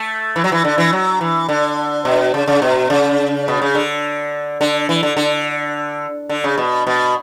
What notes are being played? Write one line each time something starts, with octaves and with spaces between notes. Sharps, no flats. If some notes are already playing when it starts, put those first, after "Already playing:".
Already playing: A3
E3
F#3
E3
D3
E3
F#3
E3
D3
B2
C#3
C#3
B2
C#3
B2
C#3
D3
D3
E3
D3
D3
D3
C#3
B2
B2